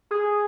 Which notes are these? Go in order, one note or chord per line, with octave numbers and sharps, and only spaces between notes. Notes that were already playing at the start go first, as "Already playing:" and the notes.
G#4